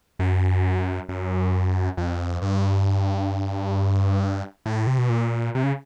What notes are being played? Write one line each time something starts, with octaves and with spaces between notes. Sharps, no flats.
F#2
F#2
F2
G2
A2
C3
B2
A#2
C3
C#3